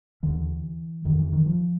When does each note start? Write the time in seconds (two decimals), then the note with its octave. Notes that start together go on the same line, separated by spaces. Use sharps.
0.23 D#2 D3 E3
1.05 F2 D3 D#3
1.19 E3
1.33 D#3
1.46 F3